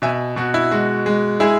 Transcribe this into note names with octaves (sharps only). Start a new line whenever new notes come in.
B2 E5 G#5
B2 F#4
E4
G#3 F#4
G#3
G#3 E4 G#4